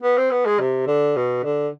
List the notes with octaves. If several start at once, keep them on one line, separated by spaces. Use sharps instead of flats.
B3
C4
B3
G#3
C3
D3
B2
D3